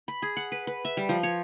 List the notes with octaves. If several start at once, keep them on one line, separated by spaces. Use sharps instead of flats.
B5
G#4
F#5
B4
B4
E5
G3
F3
C#5